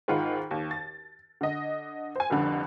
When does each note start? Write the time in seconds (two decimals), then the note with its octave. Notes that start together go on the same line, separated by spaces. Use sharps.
0.08 G#2 D#3 F4 F#5 B5
0.51 D#2
0.71 A6
1.41 D3 D#5
2.16 C5 G#5
2.30 F1 C2 F2 D3 B5